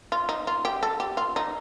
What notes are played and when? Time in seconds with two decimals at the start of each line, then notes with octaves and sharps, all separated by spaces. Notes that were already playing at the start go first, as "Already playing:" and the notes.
0.12 F4
0.29 D#4
0.47 F4
0.65 G4
0.83 A4
1.00 G4
1.17 F4
1.36 D#4